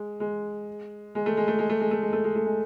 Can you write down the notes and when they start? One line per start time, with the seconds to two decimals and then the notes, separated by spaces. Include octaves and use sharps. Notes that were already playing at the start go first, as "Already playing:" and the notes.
Already playing: G#3
0.20 G#3
1.15 G#3
1.26 A3
1.37 G#3
1.48 A3
1.59 G#3
1.69 A3
1.80 G#3
1.91 A3
2.02 G#3
2.13 A3
2.24 G#3
2.35 A3
2.46 G#3